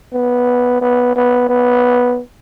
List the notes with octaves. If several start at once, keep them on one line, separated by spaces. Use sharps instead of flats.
B3
B3
B3
B3